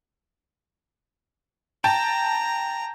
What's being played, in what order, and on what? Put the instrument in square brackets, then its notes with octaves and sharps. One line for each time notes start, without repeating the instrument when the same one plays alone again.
[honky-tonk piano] G5 A5 [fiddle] A#5